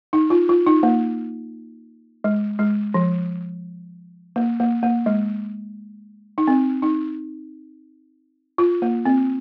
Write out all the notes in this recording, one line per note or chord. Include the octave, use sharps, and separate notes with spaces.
D#4
F4
F4
D#4
A#3
G#3
G#3
F3
A#3
A#3
A#3
G#3
D#4
C4
D#4
F4
A#3
C4